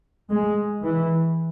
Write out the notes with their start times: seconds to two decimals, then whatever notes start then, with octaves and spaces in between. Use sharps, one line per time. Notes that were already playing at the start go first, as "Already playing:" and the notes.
0.29 G#3
0.83 E3